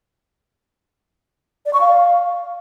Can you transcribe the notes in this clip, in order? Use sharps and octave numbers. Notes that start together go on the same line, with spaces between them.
D5
C#6
F5